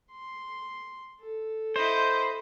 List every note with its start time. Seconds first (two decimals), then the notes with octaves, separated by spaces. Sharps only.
0.11 C6
1.20 A4
1.76 E4 C5 D#5